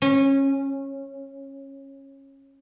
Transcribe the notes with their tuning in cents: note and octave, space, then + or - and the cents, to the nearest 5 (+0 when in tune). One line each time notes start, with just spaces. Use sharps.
C#4 -20